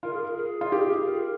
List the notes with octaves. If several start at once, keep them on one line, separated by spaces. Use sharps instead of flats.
F4 A#4
G#4
A#4
G#4
F4
G4
A#4
G#4
A#4